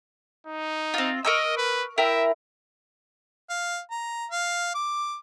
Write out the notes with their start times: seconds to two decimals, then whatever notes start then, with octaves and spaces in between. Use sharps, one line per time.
0.46 D#4
0.94 C4 F4
1.25 A#4 D#5 C#6 E6
1.57 B4
1.98 E4 A#4 E5 G5
3.49 F5
3.90 A#5
4.31 F5
4.75 D6